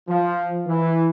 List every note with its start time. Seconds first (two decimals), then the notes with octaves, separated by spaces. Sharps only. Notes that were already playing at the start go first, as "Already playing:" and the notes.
0.09 F3
0.67 E3